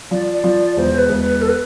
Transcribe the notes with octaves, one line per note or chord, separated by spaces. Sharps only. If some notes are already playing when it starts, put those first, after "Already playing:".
F3 D5
D5
F3
E1 C5
B4
E1
B4
A4
B4